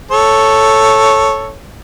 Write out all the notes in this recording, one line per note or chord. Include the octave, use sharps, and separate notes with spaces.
A4 C#5